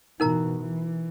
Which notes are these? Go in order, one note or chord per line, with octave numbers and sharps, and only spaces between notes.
B2 E3 D#4 A#4 A#5
E3